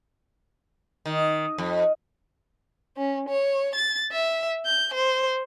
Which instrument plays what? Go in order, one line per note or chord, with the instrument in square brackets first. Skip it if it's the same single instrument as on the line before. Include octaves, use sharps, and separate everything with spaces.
[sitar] D#3
F2
[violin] C#4
C#5
A6
E5
G6
C5